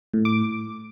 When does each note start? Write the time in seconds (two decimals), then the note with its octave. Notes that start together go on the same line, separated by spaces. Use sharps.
0.14 A2
0.25 D6